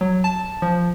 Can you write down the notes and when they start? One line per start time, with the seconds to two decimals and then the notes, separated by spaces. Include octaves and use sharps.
0.01 F#3
0.24 A5
0.62 F3